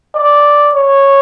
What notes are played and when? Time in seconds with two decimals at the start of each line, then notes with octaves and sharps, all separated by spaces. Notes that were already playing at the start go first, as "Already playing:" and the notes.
0.15 D5
0.75 C#5